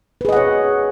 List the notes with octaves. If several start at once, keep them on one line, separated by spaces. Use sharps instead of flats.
G#4 B4 C#5 D#5 F#5